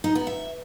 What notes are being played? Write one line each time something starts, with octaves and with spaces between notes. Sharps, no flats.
D#4
B3
E5